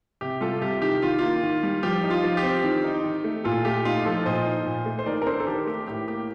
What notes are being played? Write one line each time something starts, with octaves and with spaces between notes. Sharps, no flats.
C3 G4
G3 F4 A4
C3 G4
D#3 G4
D#3 F4
A#3 F4
D#3
G3
F3 G4
D#4
F4
F3
G4
C4
D#3
D#4
D#3
A3
A#2 F4 A4
A3 G4
D#4 F4
F3 F4 A4
A#2 C5 D#5
D#4
A#2
A3
C5
D#3 A#4 D5
A#4
D4 A4 C5
A4
D#3 G4 A#4
A3 G4
A2 G4
A#3 G4